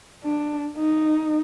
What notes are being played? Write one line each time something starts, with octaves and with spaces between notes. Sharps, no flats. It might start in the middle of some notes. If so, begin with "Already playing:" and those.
D4
D#4